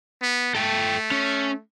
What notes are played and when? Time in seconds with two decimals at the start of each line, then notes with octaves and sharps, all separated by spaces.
0.22 B3
0.55 A3 A4 G5
1.11 C#4